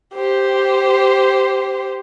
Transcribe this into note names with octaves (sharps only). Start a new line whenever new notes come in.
G4 C5